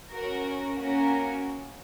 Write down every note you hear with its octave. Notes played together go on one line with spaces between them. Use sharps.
C#4 F#4 A#4
A#3 C#4 F#4 A#4